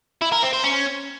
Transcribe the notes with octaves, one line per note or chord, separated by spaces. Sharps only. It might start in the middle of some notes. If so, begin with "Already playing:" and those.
E4
A#4
C4
C5
C#4